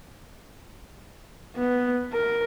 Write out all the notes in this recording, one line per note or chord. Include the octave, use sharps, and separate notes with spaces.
B3
A#4